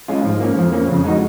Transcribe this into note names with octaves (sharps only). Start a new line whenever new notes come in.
G#3 C#4 F4
G#2 F3
A#3 C#4
F2 F3
A#3 C#4
F2 C#3
G#3 D#4 F#4